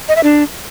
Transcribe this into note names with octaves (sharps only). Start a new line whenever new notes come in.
D#5
E5
D4